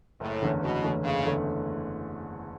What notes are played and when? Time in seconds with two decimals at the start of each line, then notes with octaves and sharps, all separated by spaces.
0.20 F#1 A2
0.42 E2 D3 A3 C#4
0.62 F#1 B2
0.83 E2 D3 A3 C#4
1.04 F#1 C#3
1.24 E2 D3 A3 C#4